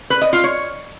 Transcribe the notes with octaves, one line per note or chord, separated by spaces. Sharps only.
B4
D#5
F4
C#5